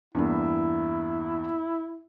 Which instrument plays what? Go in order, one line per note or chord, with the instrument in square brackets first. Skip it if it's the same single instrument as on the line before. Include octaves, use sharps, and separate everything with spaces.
[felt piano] E2 G2 A#3 [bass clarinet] E4